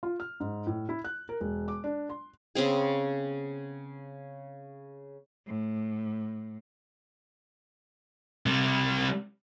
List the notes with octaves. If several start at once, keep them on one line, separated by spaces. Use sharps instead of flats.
F4
F6
G#2
A2
E4
F#6
A#4
E1
D6
D4
C6
C#3 B3 C4 G#4
A2
C3 G3